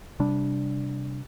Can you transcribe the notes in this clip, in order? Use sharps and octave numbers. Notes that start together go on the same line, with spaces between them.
C3 G3 D4